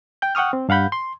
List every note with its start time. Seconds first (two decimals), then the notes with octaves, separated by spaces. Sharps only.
0.22 G5 G6
0.35 F#5 G5 C#6 D#6 F6
0.53 C4
0.69 G2 F5 F#5 B5 G6
0.92 C6